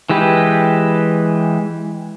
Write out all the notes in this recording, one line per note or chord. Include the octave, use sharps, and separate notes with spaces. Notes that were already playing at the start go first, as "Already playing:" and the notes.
E3 G#3 G4 B4